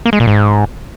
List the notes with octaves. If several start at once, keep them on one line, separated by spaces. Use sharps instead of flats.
A#3
G#3
A#2
G#2